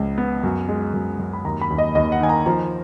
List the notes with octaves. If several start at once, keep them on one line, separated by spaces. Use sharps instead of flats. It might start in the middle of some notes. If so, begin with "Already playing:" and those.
Already playing: C#2 C#3 F3
B3
F#2
G#3
F#2
F#2
B5
D#2 A#5
B5
D#2
D#5
D#2 D#5
F#5
D#3 G#5
A#5
F3 A#5